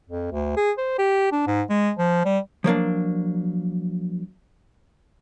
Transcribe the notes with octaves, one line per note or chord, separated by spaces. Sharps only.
F2
D2
G#4
C5
G4
D4
G#2
G#3
F3
G3
F3 F#3 A#3 D4